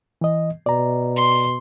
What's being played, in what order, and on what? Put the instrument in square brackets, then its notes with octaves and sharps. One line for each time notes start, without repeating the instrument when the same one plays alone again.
[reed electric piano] E3 D#5
[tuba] B2 [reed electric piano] D5 A#5
[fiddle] C6